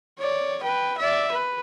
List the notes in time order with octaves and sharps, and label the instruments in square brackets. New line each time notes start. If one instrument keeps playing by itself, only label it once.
[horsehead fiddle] C#5 D5
B4 G5
D5 E5
B4